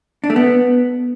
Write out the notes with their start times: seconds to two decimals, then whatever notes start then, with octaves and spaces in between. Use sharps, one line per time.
0.24 D4
0.30 A3
0.36 B3